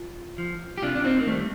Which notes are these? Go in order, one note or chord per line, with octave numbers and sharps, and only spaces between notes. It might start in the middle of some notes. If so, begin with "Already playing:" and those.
Already playing: F4
F3
G4
C3 D4 F4
D4
C4 D#4
A#3
D#3 G3 A3